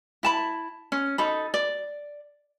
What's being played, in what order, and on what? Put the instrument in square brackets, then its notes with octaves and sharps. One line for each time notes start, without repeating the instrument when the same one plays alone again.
[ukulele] E4 A5 B5
C#4
D#4 A4 B5
D5